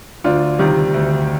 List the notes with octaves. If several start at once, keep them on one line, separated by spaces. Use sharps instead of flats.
D2 D4 F4
C3 D#3 G3
D2